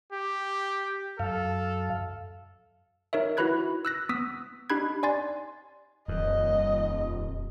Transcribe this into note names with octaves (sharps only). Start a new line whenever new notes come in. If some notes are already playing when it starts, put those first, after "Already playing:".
G4
F#2 A4 F5
D#4 A#4 C#5 E5
E4 F#4 B4 B5 F#6 G#6
E6 F#6 A#6
B3 D#6 E6 B6
D4 D#4 G4 B5 F#6 G#6
D5 G#5 C6 A6
D#1 F2 D#5